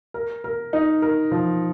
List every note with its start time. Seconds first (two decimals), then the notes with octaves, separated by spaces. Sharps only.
0.14 A#4
0.44 A#4
0.73 D#4
1.02 A#4
1.31 F3